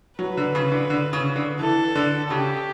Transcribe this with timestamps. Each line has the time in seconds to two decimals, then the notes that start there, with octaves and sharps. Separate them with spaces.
0.19 F#3 B4
0.37 D3
0.55 C#3
0.72 D3
0.90 D3
1.13 C#3
1.36 D3
1.59 E3 A4
1.95 D3
2.30 C#3 G4